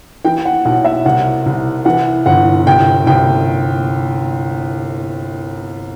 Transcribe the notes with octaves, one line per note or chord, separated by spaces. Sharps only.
E3 G5
F#5
B1 F#5
E5
C2 F#5
C2
E3 F#5
G1 F#5
C2 G5
C2 G5